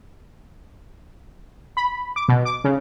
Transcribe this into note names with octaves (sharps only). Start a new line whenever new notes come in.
B5
D6
B2
D6
C#3